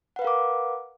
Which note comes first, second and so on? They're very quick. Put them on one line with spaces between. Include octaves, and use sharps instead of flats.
F#5 B4 F5 A#4 D6